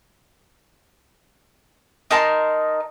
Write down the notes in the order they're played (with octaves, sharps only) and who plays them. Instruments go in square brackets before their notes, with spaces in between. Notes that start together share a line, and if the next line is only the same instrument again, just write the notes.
[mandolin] D#4 A#4 A5 C6